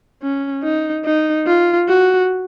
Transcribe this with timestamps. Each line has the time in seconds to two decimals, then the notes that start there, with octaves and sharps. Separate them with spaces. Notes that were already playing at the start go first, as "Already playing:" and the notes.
0.22 C#4
0.63 D#4
1.05 D#4
1.47 F4
1.89 F#4